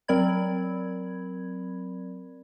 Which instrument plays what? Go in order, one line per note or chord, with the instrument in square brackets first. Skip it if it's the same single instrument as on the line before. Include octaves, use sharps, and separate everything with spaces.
[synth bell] F#3 C4 A#4 D5 B5 G#6